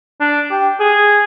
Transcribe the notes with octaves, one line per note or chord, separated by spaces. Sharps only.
D4
G4
G#4